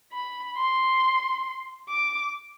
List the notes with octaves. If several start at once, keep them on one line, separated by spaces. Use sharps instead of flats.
B5
C6
D6